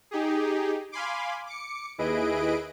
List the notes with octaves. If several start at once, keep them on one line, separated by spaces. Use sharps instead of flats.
D#4 G4 G#4
F5 G#5 B5 C6 D6
D6 C#7
D#2 E4 G#4 B4 D#5 D7